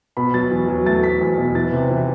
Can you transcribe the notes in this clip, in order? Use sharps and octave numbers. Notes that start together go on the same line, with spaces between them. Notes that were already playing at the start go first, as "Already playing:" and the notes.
B2 B5
F#3 A6
E2
F#3
A3 A6
A3 B6
E2
B2
E3 A6
C3
E3